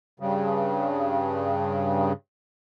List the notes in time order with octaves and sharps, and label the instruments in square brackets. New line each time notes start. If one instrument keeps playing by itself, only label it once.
[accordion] G2 C#3